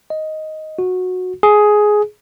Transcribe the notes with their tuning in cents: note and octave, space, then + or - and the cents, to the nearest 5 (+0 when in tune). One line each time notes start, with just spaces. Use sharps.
D#5 +5
F#4 -15
G#4 +10